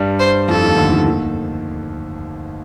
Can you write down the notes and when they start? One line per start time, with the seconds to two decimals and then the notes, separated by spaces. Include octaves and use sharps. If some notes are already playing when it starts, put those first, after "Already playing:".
Already playing: G2 G3
0.20 C5
0.48 F2 F3 A4
0.62 D#2 D#3
0.76 D2 D3
0.91 D#2 D#3
1.05 D#2 D#3